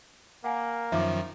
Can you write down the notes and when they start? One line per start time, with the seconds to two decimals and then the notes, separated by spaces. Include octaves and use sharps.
0.44 A#3 F#5 G#5
0.92 F#2 D#3 F3 E5 D6